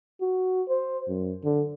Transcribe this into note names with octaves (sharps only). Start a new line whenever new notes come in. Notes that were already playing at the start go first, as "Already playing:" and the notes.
F#4
C5
F#2
D3